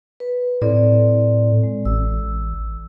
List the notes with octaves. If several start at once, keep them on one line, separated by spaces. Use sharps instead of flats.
B4
A2 C4 A4 D5
G#3
A1 E6